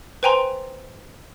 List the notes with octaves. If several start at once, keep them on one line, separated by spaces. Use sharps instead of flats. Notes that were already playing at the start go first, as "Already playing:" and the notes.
B4 C5 G5 G#5 A#5 C6